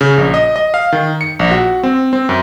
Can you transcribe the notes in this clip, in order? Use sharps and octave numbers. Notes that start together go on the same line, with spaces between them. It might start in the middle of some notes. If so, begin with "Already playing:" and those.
C#3
A#1
D#5
D#5
F5
D#3
C#7
A#1
F#4
C4
C4
F#2